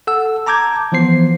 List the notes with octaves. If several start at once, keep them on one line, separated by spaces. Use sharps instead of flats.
A4 F#5 E6
A5 A#5 D6 G6 G#6
E3 F3 B3 C5 C7